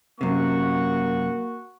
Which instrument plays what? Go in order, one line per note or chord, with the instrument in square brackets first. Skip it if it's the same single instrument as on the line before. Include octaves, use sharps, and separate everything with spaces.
[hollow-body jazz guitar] F#2 C3 [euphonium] A#3 [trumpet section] F#4 F#5 C#6